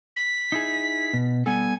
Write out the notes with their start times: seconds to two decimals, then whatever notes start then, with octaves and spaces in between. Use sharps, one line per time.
0.16 B6
0.52 D#4 E4 G#4
1.13 B2
1.46 G3 B3 A4 G#5